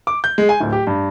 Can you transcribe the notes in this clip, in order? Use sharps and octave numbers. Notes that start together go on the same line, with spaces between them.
D6
G6
G#3
G#5
D1
G4
G2